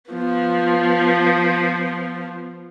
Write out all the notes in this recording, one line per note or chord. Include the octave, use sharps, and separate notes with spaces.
F3 B3